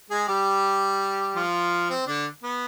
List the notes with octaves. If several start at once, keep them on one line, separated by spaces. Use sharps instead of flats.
G#3 G#4
G3 G4
F3 F4
C4
D3 D4
B3